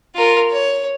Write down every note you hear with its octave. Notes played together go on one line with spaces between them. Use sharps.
F4 A#4
C#5